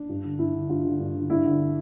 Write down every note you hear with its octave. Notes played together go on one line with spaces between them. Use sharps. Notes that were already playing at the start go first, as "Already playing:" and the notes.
Already playing: D4
G2
D3
G2 E4
D3
G2 F4
D3
G2
D3
G2 E4
D3